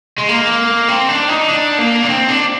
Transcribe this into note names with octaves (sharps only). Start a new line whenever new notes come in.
G#3
A#3
C4
D4
D#4
D4
A#3
D4
C4
D4